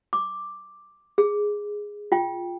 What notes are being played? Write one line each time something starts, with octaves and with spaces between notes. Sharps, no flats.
D6
G#4
F4 G5